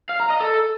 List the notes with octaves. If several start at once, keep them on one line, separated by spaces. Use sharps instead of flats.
F5
A#5
D#5
A4